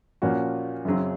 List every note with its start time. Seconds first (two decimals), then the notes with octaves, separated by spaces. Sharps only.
0.22 A#2 F3 A#3 C#4 F#4
0.85 F#2 C#3 F#3 C4